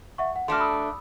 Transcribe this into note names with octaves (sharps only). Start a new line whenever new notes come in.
E5 F#5 C#6
F#5
A3 D4 F#4 C6 F6
B5 D#6 E6